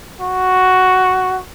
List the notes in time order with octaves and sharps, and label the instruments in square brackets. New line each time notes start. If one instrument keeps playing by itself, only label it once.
[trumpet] F#4